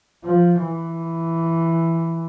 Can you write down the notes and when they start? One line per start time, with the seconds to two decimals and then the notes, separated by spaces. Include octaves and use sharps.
0.24 F3
0.65 E3